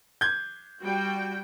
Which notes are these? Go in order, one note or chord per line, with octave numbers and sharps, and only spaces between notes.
G6 G#6
G3 F#4 G5